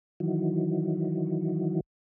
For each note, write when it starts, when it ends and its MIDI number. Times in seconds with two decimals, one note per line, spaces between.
0.20 1.80 51
0.20 1.80 52
0.20 1.80 54